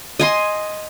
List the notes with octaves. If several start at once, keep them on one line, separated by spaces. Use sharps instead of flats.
D#5 G#5 C6